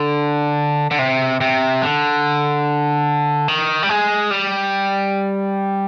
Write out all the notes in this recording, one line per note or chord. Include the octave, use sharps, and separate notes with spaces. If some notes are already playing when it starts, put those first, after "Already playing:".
Already playing: D3
D3
C3
C3
D3
D#3
G3
G#3
G3